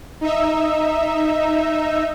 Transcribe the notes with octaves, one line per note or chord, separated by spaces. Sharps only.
D#4 E5